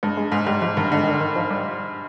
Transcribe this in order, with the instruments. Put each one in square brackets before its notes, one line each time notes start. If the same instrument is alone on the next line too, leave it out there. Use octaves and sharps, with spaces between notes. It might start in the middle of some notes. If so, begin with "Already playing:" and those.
[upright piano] G2 [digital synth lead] G#3
[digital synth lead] G#3
[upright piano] G#2 [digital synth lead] G#3
[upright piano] G#2 [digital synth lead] G3
[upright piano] G#2 [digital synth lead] F3
[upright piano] G2 [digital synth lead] D#3
[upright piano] G#2 [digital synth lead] D3
[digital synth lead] D#3
D3
D#3
F3
G3